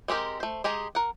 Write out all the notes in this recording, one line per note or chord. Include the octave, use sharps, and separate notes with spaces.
G#3 C4 G4 A#4
A3 C5
G#3 G4 G#4 A#5
A#4 F#5